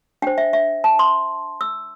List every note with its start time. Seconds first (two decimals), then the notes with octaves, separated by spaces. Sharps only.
0.22 D4 C5 G5
0.38 E5
0.53 E5
0.84 A5
0.99 C6
1.61 E6